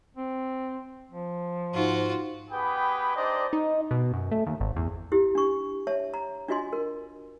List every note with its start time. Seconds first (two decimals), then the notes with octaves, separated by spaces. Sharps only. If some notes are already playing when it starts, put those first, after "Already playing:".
0.16 C4
1.11 F3
1.74 G#2 F4 F#4
2.51 B3 G4 G#4 B4 G5 B5
3.15 D4 D#4 G4 C5 D5 D#5
3.53 D#4
3.91 B2
4.13 F#2
4.31 A3
4.46 D#2
4.61 G#1
4.76 E2
5.12 E4 G4
5.35 D4 C#6
5.87 C#5 E5 A5
6.14 A#5
6.48 D4 F4 F#4 D#5 G#5 C6
6.73 A#4